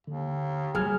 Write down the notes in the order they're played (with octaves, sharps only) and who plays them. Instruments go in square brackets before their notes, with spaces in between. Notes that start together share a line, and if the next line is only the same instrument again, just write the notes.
[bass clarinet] D#2 [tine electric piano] D3
[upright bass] F#3 G3 [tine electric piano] G#4 F6 G#6